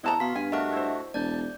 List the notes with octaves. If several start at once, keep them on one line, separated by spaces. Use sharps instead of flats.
E2 C4 E4 D#5 F#5 A5 A#5
B2 B3 F5 C6 B6
G2 G#5
A3 D4 F#4 A#4 D#5 E5 F#5 A5
E4 C5
E1 D5 A5 G6